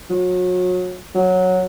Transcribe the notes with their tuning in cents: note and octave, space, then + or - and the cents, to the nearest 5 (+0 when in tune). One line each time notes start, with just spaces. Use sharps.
F#3 -30
F#3 -10